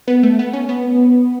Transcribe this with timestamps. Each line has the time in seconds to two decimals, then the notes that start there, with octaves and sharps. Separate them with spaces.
0.08 B3
0.23 A3
0.39 B3
0.53 C#4
0.69 B3